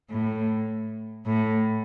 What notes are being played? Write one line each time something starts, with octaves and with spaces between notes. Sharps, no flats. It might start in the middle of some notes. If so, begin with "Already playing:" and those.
A2
A2